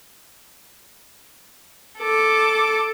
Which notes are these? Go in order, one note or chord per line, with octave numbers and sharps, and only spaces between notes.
A4 D6